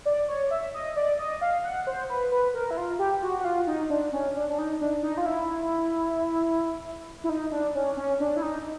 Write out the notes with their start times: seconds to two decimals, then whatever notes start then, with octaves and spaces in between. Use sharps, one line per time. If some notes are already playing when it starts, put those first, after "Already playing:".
0.05 D5
0.28 C#5
0.51 E5
0.74 D#5
0.96 D5
1.19 D#5
1.41 F5
1.64 F#5
1.87 C5
2.09 B4
2.31 B4
2.54 A#4
2.71 E4
2.78 F4
2.99 G4
3.23 F#4
3.40 F#4
3.45 F4
3.67 D#4
3.90 D4
4.12 C#4
4.35 D4
4.50 D4
4.58 D#4
4.81 D4
5.03 D#4
5.17 F4
5.26 E4
7.24 E4
7.29 D#4
7.51 D4
7.75 C#4
7.97 C#4
8.20 D4
8.36 E4
8.42 D#4